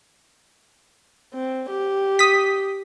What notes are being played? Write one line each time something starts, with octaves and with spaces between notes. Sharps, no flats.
C4
G4
D#6 B6